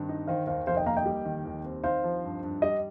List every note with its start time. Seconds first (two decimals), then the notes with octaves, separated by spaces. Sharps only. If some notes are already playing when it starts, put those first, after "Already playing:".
Already playing: G2 D#3 C4
0.09 D#4
0.27 D#3 C5 F5
0.47 D#2 C5 F5
0.67 F1 C5 F5
0.77 D#5 G5
0.86 A#3 F5 A#5
0.97 D#5 G5
1.05 G3
1.25 D#3
1.46 D#2
1.64 C4
1.84 D#4 C5 F5
2.04 F3
2.24 G2
2.43 G2
2.62 G3 D#5